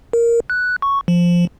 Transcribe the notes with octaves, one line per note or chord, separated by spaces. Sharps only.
A#4
F#6
C#6
F3